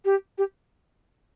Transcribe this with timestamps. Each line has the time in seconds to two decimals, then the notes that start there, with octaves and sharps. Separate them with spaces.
0.05 G4
0.38 G4